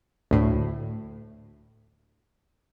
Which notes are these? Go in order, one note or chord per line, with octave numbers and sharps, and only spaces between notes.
D2 A2